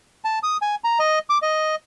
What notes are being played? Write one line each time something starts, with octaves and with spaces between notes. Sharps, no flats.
A5
D#6
G#5
A#5
D#5
D6
D#5